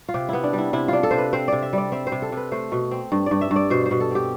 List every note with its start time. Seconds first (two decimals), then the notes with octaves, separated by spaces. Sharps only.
0.08 F4
0.14 C3 G4
0.29 B3 E4
0.44 D4
0.53 G3 E4
0.73 C3 E4
0.88 D4 F4
1.03 A4
1.11 C3 C5
1.18 B4
1.33 C4 C5
1.48 C3 D5
1.62 E5
1.73 G3 D5
1.92 C4 E5
2.07 C5
2.12 C3
2.22 A4
2.32 C3 B4
2.52 A3 C5
2.72 B2
2.91 C4
3.12 G2
3.26 G2 D5
3.41 E5
3.51 G2
3.56 D5
3.70 B2 C5
3.86 C5
3.91 B2
4.00 A4
4.11 C4 G4